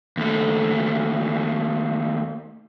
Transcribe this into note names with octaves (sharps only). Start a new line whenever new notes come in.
D#2 A3